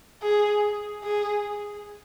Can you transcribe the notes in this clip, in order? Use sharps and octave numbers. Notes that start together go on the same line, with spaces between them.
G#4
G#4